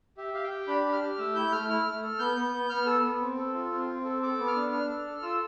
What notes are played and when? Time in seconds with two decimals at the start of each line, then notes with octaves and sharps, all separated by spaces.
0.17 G4 E5
0.34 G4 F5
0.43 G5
0.51 G4
0.68 D4 B5
0.85 G4
0.92 F6
1.01 G4
1.18 A3 E6
1.35 E4 G6
1.52 A3 F6
1.69 E4 F6
1.86 A3
2.03 A4
2.19 B3 G6
2.37 B3
2.54 B3
2.69 B3 F6
2.86 A4 E6
3.03 B3
3.21 C4
3.37 A4
3.54 F4
3.72 C4
3.88 C4
4.05 A4
4.22 A4 D6
4.39 B3
4.47 F6
4.56 D4
4.72 D4 F6
4.89 A4
5.07 A4
5.22 F4 E6